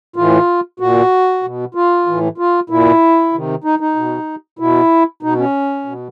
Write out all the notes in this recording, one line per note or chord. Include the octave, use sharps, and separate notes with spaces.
A2 E3 F4
A#2 F#4
B2
F4
A2 E3
F4
A#2 E4
C3 D#3
D#4
D#4
B2
B2 E4
B2 D#4
C#4
B2